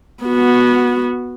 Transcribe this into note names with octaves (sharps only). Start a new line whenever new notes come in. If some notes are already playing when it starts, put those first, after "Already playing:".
B3 F#4